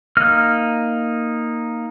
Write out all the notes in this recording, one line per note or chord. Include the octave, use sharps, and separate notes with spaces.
A#3 D#4 F6